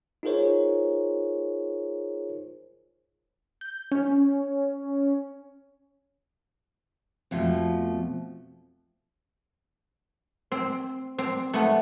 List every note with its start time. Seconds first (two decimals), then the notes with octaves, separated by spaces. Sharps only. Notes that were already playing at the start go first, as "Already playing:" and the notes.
0.23 D#4 F4 G#4 A#4 C5 C#5
3.61 G6
3.92 C#4
7.31 F2 B2 F3 A3
10.52 C4
11.18 C4
11.53 A3 B3